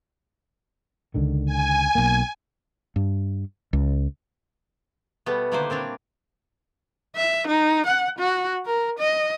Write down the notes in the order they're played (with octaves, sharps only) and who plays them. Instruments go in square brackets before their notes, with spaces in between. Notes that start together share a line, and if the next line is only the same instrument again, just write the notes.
[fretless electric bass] C#2 D3 D#3
[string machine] G#5
[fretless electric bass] B1 A#3
G2
C#2
[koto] B2 G3 A3 B3
D3 D#3 A#3 E4 B4 C5
A#2 C4 D4 C#5
[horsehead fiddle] E5
D#4
F#5
F#4
A#4
D#5